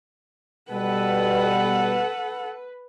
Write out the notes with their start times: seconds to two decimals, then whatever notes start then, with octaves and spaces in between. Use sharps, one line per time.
0.71 B2 G3 A4 B4 F#5